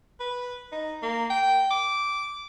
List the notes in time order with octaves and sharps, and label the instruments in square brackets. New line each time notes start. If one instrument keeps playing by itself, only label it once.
[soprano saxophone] B4
D#4
A#3
G5
D6